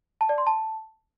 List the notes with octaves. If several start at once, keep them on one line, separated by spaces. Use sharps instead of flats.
A5
D5
C6
A5